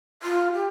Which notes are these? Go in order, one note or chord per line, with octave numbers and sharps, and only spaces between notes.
F4
G4